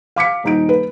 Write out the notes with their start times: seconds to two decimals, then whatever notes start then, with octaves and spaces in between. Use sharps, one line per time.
0.16 F5 D6 B6 C#7
0.44 D#1 D#4 D7
0.69 B4